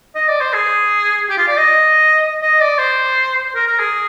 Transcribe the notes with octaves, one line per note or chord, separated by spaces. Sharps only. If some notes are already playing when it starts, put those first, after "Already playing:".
D#5
D5
C5
G#4
G4
F4
D5
D#5
D#5
D5
C5
A#4
A#4
G#4